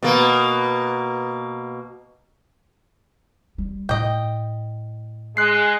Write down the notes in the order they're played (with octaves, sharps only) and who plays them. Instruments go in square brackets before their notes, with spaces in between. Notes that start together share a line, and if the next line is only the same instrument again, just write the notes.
[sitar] B2 A#3
[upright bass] G3
[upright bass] A2 [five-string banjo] D#5 G5
[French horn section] G#3 [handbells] F#6 C7